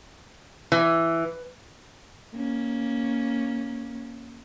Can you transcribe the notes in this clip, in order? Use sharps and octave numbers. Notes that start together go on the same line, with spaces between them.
E3
A#3 C#4